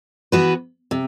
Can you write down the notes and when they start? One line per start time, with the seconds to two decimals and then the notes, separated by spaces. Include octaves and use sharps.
0.32 E3 B3 F#4 B4
0.91 C3